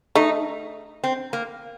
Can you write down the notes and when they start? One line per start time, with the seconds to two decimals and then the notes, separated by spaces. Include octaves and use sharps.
0.15 A3 D#4
1.04 C4
1.33 A#3